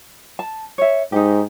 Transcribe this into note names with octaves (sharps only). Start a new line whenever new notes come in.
A5
C#5 E5
G#2 D#4 G4